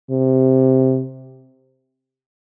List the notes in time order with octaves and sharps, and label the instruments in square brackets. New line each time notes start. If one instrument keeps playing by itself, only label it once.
[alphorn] C3